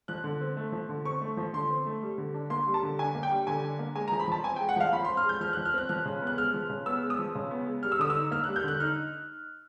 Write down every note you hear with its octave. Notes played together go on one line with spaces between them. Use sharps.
F3 F#6
D3
C4
A3
F3
D3
C4 C#6
A3
F3
D3 C6
C4
A3
G3
D3
D4
A#3 C6
G3
A5
D3
D4 G#5
A#3
G5
G3
D3 G#5
D4
A#3
G#3 G#5
A#5
F3
B5
F3 A5
C4 G#5
G5
G#3
F#5
F3 F5
F3 B5
C6
C4
F6
G#3 G6
F3 F6
F#6
F3
F6
C4 F#6
F3 F#6
C#3
B3
F#6
G#3 F6
F3
C#3
B3 E6
G#3
D#6
F3
C#3
B3
G#3
G3 F6
E6
D3 D#6
E6
D#4
A#3 F6
F#6
G3
G6
D3 F#6
D#4 F6